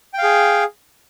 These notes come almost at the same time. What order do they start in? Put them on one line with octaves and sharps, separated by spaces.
G5 F5 G#4